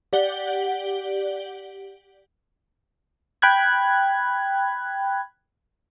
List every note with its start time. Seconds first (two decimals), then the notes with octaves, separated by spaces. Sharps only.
0.13 G4 D5 F#5 G7
3.42 G5 B5 F#6 G#6